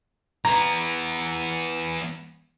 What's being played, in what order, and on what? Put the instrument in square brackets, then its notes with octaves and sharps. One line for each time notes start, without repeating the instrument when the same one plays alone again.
[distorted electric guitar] E3 B3 [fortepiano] A#5